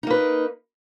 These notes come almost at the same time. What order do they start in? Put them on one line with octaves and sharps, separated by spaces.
D#4 A#3 B4